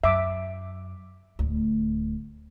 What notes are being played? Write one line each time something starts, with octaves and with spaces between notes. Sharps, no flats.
F#2 E5 D6
D1 D2